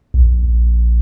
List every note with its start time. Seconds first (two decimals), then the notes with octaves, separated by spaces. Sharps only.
0.14 A#1